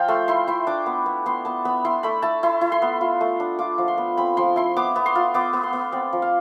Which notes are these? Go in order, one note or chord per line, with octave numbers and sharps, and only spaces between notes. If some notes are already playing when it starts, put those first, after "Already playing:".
Already playing: F3 F5 G5
A3 C6
E4 C6
E4 C6
D4 D6
B3
B3
B3 C6
B3 A5
B3 B5
E4 C6
A3 B5
E4 A5
E4 C6
E4
C6
B3
F4
A3
D4
F4 D6
F3
C6
B3
C4 B5
F3 C6
E4 C6
B3 D6
B3
C6
F4
B3 D6
B3
C6
B3
C4 D5
F3
F5